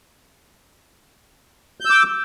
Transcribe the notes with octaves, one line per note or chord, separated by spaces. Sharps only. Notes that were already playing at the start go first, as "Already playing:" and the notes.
D6 E6 G6